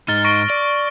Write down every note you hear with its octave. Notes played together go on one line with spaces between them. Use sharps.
G#2 D#4 F6 A6 G7
C#6 A#6 D7
D5